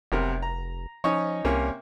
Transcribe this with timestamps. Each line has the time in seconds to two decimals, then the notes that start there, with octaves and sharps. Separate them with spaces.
0.12 F1 B1 C3 A#4
0.42 A#5
1.04 F3 C#4 D#4 C#5
1.45 C2 C3 A#3 C#4